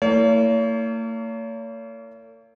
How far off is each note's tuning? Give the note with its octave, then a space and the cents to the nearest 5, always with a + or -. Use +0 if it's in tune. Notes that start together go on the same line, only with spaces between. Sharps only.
A#3 -45 E4 +0 C#5 +40